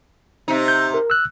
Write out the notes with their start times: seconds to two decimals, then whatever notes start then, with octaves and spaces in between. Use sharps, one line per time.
0.48 C3 D#4
0.68 G6
0.94 A#4
1.10 E6 F#6